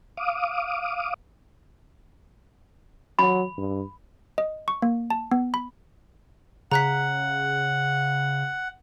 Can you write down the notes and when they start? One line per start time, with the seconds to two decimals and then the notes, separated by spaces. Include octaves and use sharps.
0.17 F5 D6 D#6
3.19 F#3 B5
3.58 G2
4.38 D#5
4.68 C#6
4.82 A#3
5.10 A5
5.32 B3
5.54 B5
6.72 C#3 F#5 A#5 F#6 B6